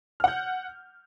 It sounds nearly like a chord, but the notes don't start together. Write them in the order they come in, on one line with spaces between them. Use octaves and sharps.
F6 F#5 G6